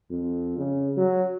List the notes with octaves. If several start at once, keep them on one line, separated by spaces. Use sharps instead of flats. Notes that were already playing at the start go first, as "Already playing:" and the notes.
F2
C#3
F#3